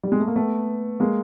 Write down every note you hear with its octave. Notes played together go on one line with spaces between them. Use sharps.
G3
G#3
A3
A#3
A3 B3
G#3 A#3